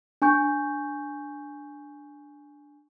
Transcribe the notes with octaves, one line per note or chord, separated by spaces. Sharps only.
D4 G#5 C#6 G6